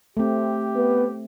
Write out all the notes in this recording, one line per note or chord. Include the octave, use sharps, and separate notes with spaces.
A3 C4 G4
B3